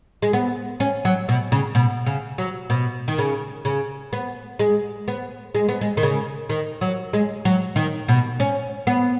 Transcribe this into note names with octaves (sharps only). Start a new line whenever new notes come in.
G#3
B3
C#4
F#3
B2
C#3
B2
C#3
F#3
B2
D#3
C#3
C#3
B3
G#3
B3
G#3
B3
G#3
D#3
C#3
D#3
F#3
G#3
F#3
D#3
B2
C#4
B3